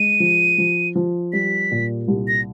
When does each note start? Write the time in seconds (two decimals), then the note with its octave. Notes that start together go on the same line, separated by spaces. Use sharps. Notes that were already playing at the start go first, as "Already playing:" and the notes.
Already playing: G#3 D#7
0.20 F3
0.58 F3
0.95 F3
1.33 G3 B6
1.71 A#2
2.08 C2
2.28 A#6